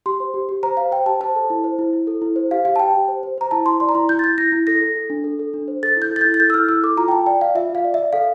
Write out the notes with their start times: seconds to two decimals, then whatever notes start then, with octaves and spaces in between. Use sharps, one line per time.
0.06 G4 C6
0.20 C5
0.34 G4
0.49 G4
0.63 C5 A#5
0.77 C5 F5
0.92 C5 G5
1.06 G4 A5
1.21 C5 A5
1.35 A4
1.50 E4
1.64 C5
1.79 E4
1.93 E4
2.07 A4
2.22 E4
2.36 C5
2.51 G4 F5
2.65 G4 F5
2.76 A5
2.79 G4 G5
2.94 G4
3.08 C5
3.23 C5
3.38 C5 A#5
3.51 E4 A5
3.66 E4 C6
3.80 D5 C6
3.89 A#5
3.95 E4 C6
4.09 E4 G6
4.19 A6
4.24 E4 G6
4.38 E4 A#6
4.52 E4
4.67 A4 A#6
4.81 A4
4.96 A4
5.10 D4
5.24 A4
5.39 A4
5.54 D4
5.68 C5
5.83 A4 A6
5.97 E4
6.02 G6
6.11 A4 A6
6.21 G6
6.25 E4
6.34 A6
6.40 A4 G6
6.50 E6
6.54 E4 F6
6.69 E4 E6
6.83 A4 D6
6.97 F4 A#5
7.08 G5
7.11 F4 A5
7.26 D5 G5
7.41 D5 F5
7.55 F4 E5
7.70 F4 F5
7.84 D5
7.94 E5
7.98 D5
8.13 A4 F5